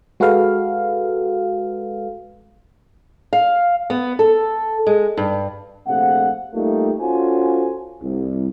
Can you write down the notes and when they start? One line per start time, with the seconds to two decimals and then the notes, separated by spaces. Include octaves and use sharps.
0.20 G#3 F#4 A4 B4 F5
3.33 F5
3.90 B3
4.19 A4
4.87 G#3
5.17 G2
5.87 A#1 C3 A3 F5 F#5
6.54 G3 A3 A#3 D#4 F4 G4
7.00 C#4 F4 F#4 A4 C5 G#5
8.02 C2